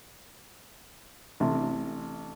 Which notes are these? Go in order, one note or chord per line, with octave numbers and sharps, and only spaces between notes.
A1 C3 D4